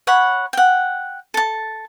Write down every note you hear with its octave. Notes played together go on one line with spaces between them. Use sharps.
C#5 F#5 B5
F#5 G5
A4 A5